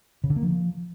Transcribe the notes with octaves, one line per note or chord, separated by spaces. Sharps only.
C#3
D3
A#3
F3